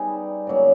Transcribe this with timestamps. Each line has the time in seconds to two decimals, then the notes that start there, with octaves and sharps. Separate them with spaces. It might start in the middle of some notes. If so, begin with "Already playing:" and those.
Already playing: G3 B3 D#4 G#4
0.47 C#3 F#3 A#3